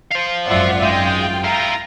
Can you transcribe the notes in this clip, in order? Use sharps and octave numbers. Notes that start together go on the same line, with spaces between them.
C5 F5
G#1 F#2 F4 D5 E5 F#5
G#3 G5
E4 F4 A#5